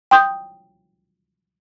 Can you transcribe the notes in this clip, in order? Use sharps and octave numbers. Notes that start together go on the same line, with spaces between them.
G5 C6 D#6 G6